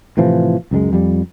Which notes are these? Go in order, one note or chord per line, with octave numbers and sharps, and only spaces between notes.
A2 C3 E3 F3
C#2 F#2 G3 G#3
F2 G3